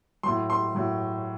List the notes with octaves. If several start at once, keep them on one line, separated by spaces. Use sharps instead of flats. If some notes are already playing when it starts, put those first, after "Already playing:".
A2 F#3 C6
C6
A2 F#3